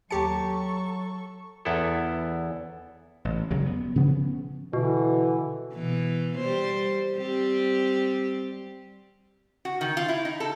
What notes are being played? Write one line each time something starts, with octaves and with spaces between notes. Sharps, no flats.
D#2 F#3 G4 A4 A5 C#6 C#7
E2 B3 E4 A4
A1
F#2 C#3 F#3 G3
B3
C#3 F3 B3 C#4
B2 D3 E3
B2 E3
G3 C5
G3 C4 G4
F#4
D#3
F4
E4
D#4
A4